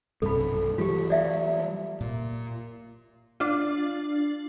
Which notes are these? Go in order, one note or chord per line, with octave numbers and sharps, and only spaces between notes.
B1 G2 C3 A4 B5
E3 F#3 G3 F4 G4
D5 E5 F5
A#2
D4 F4